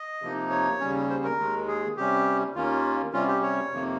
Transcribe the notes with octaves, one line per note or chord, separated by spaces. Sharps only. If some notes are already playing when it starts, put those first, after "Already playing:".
Already playing: D#5
C3 F3 A#3 D#4
C#5
D#2 C#3 G3 C#4
C5
A#4
D#2 D#3 G#3
G#4
C3 G3 C#4 G4
D#2 D#3 A#3 C#4 F4
C3 G3 C#4 F4
G4
C#5
F2 C3 D#3 A#3